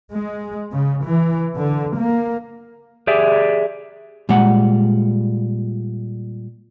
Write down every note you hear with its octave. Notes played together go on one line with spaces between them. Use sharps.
G#3
C#3
E3
D3
A#3
G4 G#4 D5 E5
A#2 G3 G#3 F#5